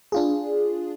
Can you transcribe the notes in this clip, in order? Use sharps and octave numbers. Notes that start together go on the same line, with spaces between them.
D4 F4 G#4